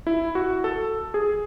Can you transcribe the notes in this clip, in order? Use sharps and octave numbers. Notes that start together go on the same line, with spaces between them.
E4
F#4
A4
G#4